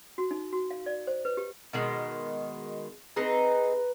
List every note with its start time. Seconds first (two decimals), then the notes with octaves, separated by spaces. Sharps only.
0.18 F#4
0.31 D#4
0.53 F#4
0.71 F5
0.86 D5
1.07 C5
1.25 B4
1.37 G4
1.73 B2 D#3 G#3
3.16 C4 D#4 G#4 B4 A#5